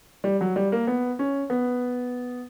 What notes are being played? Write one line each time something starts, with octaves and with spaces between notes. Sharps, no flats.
G3
F#3
G3
A#3
B3
C#4
B3